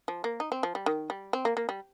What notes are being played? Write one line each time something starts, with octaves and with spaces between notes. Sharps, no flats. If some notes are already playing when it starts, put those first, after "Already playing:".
F3
A#3
D#4
C4
F3
G3
D#3
G3
C4
A#3
A#3
G3